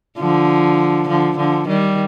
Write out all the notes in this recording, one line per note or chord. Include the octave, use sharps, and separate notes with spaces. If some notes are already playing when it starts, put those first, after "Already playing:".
D3 F3
D3 F3
D3 F3
D#3 G3